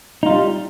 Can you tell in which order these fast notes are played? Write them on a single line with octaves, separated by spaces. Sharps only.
D#4 F4 G3